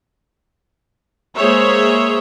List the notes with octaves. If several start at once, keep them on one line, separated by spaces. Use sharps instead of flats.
G#3 A#3 G#4 C5 C#5 E5